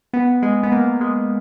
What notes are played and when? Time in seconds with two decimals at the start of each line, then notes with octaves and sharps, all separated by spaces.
0.14 B3
0.43 G#3
0.63 B3
0.72 A#3
1.01 G#3